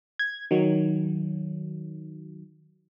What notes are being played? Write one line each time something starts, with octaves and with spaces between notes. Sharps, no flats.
G#6
D#3 F#3